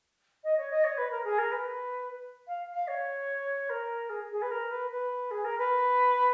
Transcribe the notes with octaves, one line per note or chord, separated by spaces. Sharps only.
D#5
C#5
D#5
C#5
B4
A#4
G#4
A#4
B4
F5
F5
C#5
A#4
G#4
G#4
B4
A#4
B4
B4
G#4
A#4
B4